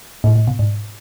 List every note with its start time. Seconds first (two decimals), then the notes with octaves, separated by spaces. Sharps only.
0.24 A2
0.36 A2
0.47 B2
0.59 G#2